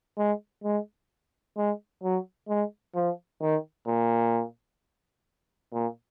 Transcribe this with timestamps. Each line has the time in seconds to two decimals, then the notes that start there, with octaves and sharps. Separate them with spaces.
0.18 G#3
0.64 G#3
1.57 G#3
2.03 F#3
2.48 G#3
2.95 F3
3.42 D#3
3.87 A#2
5.73 A#2